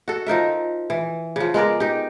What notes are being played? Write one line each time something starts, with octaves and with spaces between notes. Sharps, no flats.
F#4 A4
F3 D#4 A#4 E5
E3
C#3 F3
G#3 B3 A#4 D5
D#4 G4